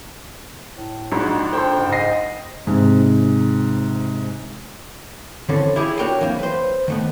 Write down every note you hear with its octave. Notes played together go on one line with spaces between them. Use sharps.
A2
A#1 G#2 G#3 F#4
A4 C5 G5 C6
F#1 G#2
D#5 A#6 C7
G#2 C3
D3 E3 C4 C#4 A4
E4 G4 G#4 C#5
D4 F#4 A#4 C#5 G5
E3 F#3 A#3 C4
B4 C5
D#3 A3 B3